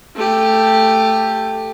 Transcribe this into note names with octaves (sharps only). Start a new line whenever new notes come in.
A3 G4